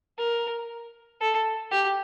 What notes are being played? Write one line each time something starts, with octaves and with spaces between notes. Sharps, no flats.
A#4
A4
G4